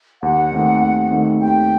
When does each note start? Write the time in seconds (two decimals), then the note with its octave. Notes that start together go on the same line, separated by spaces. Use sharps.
0.23 D#2 F#5
0.52 D#3 A3 C4 D#4
0.82 D#2
1.11 D#3 A3 C4 D#4
1.41 D#2 G5